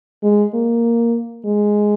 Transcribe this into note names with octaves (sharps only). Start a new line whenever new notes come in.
G#3
A#3
G#3